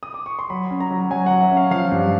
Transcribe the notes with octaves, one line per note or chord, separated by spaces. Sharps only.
D#6
D6
C#6
C6
F#3 B5
C#4
A#5
F#3
F#3 G#5
F#5
F#3
E5
C#4
F5
F3 F5
G2